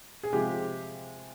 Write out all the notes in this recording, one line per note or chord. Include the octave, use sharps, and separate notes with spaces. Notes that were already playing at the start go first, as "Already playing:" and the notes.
G#4
C3 F3 G#3 G4